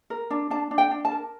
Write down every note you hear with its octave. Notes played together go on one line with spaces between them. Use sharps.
A#4
D4
D4 A5
D4
G5
D4
A5
A#4